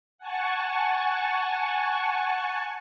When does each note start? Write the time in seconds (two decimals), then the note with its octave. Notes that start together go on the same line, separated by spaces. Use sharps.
0.18 F#5 G#5 A5 C#6